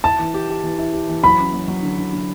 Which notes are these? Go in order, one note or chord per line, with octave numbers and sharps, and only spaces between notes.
E4 A5
E3
G4
G4
E3
E4
G4
E3
F#3 B5
C#4
F#3
F#3
D3
D3
D3